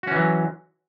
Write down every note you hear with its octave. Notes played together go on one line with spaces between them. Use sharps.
E3 F#3 C#4 F#4